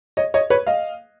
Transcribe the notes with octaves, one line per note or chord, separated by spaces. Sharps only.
C#5 D#5
C#5 D#5
B4 C#5
D#5 F5